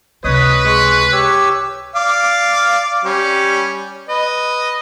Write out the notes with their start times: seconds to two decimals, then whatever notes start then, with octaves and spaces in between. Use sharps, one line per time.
0.24 C#2 C3 B4 C#5 D#5 D#6
0.65 G#3 C#6
1.12 G4 C#5 E6
1.96 D5 F5 D6
3.05 G3 C#4
4.09 B4 D#5